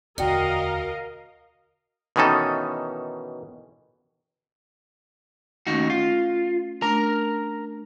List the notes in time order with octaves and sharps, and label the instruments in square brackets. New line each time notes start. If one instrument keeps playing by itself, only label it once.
[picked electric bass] E1 D2 [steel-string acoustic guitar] F#4 [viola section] A#4 D#5 F5 [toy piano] D5 G5
[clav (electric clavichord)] B2 D#3 E3 C#4 D#4 A4
[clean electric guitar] D#2 D#4 F#4 [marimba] A3 C#4
[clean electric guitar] F4
[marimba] A3 D4 A#6 [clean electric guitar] A#4 A#5